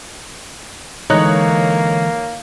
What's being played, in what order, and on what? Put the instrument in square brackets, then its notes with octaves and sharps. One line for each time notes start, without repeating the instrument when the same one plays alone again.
[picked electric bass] D3 E3 G#3 [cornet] A#3 [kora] D#4 [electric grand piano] C#5 F#6